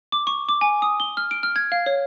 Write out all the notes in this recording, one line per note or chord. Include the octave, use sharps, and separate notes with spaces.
D6
C#6
D6
G#5
D#6
G7
F6
D7
F6
G#6
F5
C#5